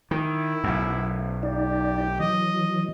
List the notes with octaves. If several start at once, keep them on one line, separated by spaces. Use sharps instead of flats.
D#3 E4
B1 F#2
D#4 G4 D5
E3 F#3 D#5